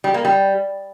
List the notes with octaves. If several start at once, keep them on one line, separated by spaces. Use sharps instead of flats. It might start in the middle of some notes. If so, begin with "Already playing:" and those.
G3
A#3
G3